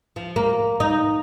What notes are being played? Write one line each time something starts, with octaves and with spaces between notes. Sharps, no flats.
F3
A#3
D#4